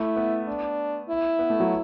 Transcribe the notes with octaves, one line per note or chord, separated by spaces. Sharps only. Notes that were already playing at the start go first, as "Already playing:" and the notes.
Already playing: A3 E4
B3
D4
E4
B3
A3
F#3